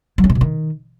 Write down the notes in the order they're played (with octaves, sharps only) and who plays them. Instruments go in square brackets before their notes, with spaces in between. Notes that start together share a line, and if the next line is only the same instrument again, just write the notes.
[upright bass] F#3
C#4
C3
B2
D#3